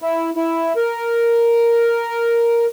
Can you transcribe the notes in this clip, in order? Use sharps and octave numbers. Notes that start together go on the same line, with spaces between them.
E4
E4
A#4